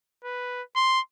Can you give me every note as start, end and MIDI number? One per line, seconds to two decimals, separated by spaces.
0.24 0.62 71
0.76 1.00 84